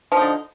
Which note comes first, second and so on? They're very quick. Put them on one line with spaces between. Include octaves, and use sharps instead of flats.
F3 D#4 D3